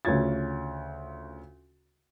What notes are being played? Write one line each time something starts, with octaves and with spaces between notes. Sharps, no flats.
D2 C#3 C#4 F4 G#6 A6